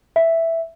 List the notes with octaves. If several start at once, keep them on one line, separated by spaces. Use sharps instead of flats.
E5